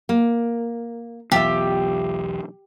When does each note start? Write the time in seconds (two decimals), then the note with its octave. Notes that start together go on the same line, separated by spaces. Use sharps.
0.09 A#3
1.32 B1 E2 F4 G4 E5